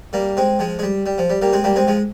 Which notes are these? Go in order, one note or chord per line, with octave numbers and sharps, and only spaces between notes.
G3 A#3
G#3 C4
F3 G#3
G#3
G3
G3
F3
G3
G3 A#3
G#3 C4
G3 A#3
G#3 C4
F3 G#3